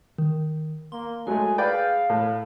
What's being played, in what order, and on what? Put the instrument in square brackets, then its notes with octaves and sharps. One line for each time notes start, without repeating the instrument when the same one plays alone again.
[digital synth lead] D#3
[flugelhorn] A#3 [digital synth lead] C6
[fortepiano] F#3 G#3 A3 [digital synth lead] G#4 [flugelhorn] G#5
[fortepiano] B4 D5 G5 [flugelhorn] F5
[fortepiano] A2